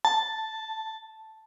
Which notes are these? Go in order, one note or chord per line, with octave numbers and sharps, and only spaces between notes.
A5